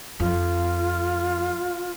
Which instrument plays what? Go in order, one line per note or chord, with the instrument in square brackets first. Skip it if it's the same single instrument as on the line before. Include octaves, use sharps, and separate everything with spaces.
[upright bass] F2 [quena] F4